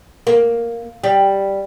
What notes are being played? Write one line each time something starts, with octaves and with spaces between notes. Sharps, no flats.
A#3
G3